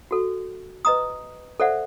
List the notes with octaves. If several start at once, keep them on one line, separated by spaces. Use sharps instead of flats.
F#4 A4
B4 D#5 A#5 D#6
A4 C5 D5 E5 F#5